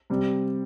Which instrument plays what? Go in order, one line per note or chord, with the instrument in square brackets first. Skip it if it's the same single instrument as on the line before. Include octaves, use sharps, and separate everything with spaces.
[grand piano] C3 G3 C4